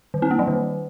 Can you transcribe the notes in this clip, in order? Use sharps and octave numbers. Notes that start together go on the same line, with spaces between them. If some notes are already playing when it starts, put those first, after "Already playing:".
D#3
C4
A#3
F#3
D#3